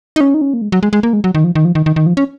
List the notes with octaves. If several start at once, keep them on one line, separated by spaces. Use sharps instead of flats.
D#4
C#4
D#4
C#4
A#3
G#3
F#3
G#3
G#3
A#3
G#3
F#3
D#3
F3
D#3
F3
D#3
D#3
D#3
F3
C#4